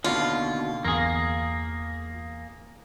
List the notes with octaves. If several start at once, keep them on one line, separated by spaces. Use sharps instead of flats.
D#2 B2 D3 F4
G1 E2 A#3 G#4 A#6